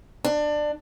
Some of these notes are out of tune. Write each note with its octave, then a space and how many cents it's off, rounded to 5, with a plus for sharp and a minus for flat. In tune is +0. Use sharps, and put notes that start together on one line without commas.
D4 +20